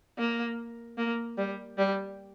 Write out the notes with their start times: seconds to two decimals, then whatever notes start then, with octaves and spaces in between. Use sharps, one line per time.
0.18 A#3
0.98 A#3
1.38 G3
1.78 G3